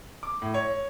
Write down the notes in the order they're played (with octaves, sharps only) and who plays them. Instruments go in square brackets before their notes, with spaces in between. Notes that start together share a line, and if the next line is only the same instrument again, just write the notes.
[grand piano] D6
A2
C#5